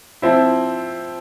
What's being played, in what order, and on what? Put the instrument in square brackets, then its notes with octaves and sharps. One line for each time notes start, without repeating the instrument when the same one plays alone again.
[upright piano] F3 C4 E4